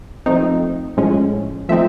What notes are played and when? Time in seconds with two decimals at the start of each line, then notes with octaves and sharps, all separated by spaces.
0.26 F3 A3 C4 D#4
0.97 A2 F3 G#3 C#4
1.69 F3 A3 C4 D#4 E5